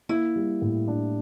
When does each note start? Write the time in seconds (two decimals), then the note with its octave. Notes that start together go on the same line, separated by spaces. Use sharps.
0.09 A#3 E4
0.36 G3
0.62 A2
0.88 D4